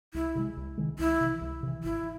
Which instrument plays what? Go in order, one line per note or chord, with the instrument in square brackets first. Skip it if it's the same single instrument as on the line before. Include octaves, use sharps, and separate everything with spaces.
[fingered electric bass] C2 [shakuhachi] E4
[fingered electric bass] C3 D#3 G#3
C2
C3 D#3 G#3
[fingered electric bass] C2 [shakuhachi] E4
[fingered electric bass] C3 E3
C2
C3 E3
[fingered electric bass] G#1 [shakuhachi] E4